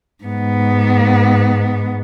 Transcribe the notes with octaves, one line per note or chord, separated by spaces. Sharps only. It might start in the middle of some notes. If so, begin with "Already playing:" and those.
G#2 B3